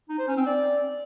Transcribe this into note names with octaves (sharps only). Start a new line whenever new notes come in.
D#4
C5
C#4
C4
D5